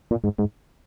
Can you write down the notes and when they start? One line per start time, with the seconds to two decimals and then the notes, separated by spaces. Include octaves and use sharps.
0.11 A#2
0.24 G#2
0.38 G#2